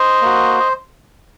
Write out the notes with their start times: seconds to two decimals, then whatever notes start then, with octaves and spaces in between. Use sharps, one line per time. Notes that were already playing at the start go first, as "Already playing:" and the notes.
Already playing: C5 D#5
0.22 A#3 F#4
0.60 D#5